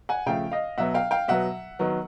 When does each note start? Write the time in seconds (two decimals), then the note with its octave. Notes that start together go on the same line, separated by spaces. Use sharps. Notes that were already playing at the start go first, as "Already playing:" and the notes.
0.09 F#5 G#5
0.26 C#3 F3 A3 F5 G5
0.52 D#5 F5
0.78 B2 F#3 B3 E5 F#5
0.94 F5 G5
1.11 F5 G5
1.28 B2 F#3 B3 E5 F#5
1.79 D#3 F#3 B3